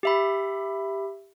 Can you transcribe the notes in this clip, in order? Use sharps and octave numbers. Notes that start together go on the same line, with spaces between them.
G4 E5 B5